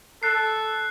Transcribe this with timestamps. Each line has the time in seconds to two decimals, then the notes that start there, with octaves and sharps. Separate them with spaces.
0.23 A4 F#6 C7